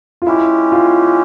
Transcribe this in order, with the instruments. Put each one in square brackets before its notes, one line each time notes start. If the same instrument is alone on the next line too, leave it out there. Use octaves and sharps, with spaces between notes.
[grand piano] F4
[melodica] G#3 C#4 G4 [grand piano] E4
[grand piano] F4